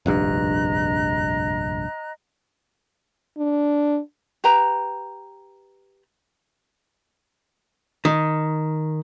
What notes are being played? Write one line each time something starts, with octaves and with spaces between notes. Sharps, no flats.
F1 A#1 G2 D#5 A#5 F#6
D4
G4 B4 A#5
D#3